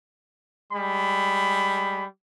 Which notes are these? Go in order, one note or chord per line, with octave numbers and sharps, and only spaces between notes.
G3 G#3 B5